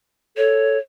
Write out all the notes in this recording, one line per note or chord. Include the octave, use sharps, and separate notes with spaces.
A4 C#5